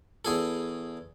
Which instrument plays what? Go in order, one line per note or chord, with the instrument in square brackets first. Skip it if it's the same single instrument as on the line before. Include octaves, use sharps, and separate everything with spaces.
[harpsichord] E2 G#4 A4